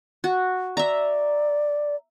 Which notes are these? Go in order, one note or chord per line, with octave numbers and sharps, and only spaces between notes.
F#4
D5 E5 A#5